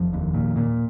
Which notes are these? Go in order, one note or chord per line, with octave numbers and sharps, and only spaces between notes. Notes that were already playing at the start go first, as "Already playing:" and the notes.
Already playing: F1 F3
D#2
A#2
A#2